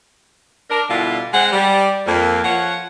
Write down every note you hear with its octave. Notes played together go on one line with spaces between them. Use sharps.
D4 A#4
B2 D3 G3 E4 F4
G#3 C4 F#5
G3
F2 A#3
F3 C#5 F#5